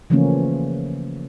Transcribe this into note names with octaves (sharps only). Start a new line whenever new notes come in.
C#3 E3 F3 A3 A#3 C#4